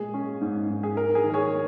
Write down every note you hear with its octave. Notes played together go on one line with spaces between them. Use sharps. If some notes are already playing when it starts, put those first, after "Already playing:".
Already playing: A#2 G#3 G#4
C#4
G#2
G#2
G#4
A#3 A#4
G#4
D#3
A#4
G#4 C#5
A#3